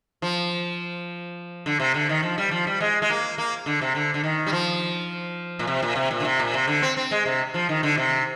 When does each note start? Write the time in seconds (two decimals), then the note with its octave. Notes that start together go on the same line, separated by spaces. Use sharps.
0.22 F3
1.66 D3
1.80 C3
1.94 D3
2.09 D#3
2.23 F3
2.38 G3
2.51 F3
2.67 G3
2.80 G#3
3.02 G#3
3.10 A#3
3.38 A#3
3.66 D3
3.81 C3
3.95 D3
4.14 D3
4.23 D#3
4.47 G3
4.52 F3
5.59 A#2
5.67 C3
5.82 A#2
5.96 C3
6.11 A#2
6.20 D3
6.25 C3
6.39 A#2
6.54 C3
6.68 D3
6.82 C4
6.97 C4
7.11 G#3
7.26 C3
7.54 F3
7.69 D#3
7.83 D3
7.97 C3